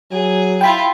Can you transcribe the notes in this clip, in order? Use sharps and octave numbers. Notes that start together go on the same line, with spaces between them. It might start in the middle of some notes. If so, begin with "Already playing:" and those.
F#3 G#4
E4 F4 G5 B5